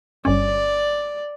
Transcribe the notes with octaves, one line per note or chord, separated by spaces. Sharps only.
G1 G2 C#4 D5